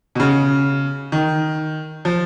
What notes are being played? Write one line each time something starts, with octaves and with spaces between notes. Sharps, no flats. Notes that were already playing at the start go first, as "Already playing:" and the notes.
B2
C#3
D#3
F3